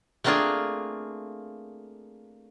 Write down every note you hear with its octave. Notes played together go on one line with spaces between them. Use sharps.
A3 A#3 C4 D4 F4 G#4